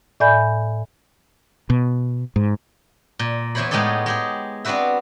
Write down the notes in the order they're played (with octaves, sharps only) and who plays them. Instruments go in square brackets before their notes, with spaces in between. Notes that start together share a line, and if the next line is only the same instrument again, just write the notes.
[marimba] A2 D5 E5 G#5 B5 G6
[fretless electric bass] B2
G#2
[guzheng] A#2
E2 E3 E4 C5 C#5 B5
A2 G#3 B3 D#4 G4 A4
G#3 G4 G#4
B3 C4 D4 F#4 B4 E5